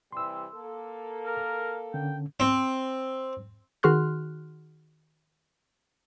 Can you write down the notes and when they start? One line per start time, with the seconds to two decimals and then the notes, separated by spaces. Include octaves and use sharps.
0.12 C3 E3 G3 C6 E6
0.54 A#3 A4
1.26 A#4
1.94 D3 C#4 G5
2.40 C4
3.83 D#3 F#4 G#4 C6 F6 F#6